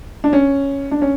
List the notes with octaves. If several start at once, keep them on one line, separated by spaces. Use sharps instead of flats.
D4
C#4
D4
C#4